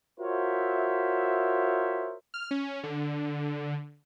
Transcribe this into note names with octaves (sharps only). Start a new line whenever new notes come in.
F4 F#4 A#4 C5 C#5 E5
F6
C#4
D3